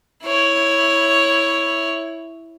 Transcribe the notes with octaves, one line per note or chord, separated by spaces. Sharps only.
E4 C#5